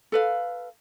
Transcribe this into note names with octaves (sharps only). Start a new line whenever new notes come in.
A4 B4 F5